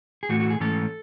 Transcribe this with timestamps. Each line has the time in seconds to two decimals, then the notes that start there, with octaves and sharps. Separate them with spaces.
0.23 G#4
0.29 A2 E3 A3 F#4
0.40 F#4
0.50 G#4
0.60 G#2 E3 A3 C#4 A4